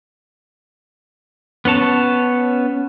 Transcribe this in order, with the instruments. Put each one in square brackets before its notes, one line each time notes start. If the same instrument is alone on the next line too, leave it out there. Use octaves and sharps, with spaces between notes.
[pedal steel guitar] B3 C#4 C#5 A5